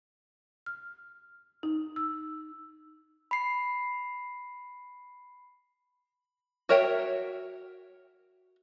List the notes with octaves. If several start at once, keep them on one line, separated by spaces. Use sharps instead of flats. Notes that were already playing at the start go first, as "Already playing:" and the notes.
F6
D#4
E6
B5 C7
F#4 A#4 C#5 E5 G5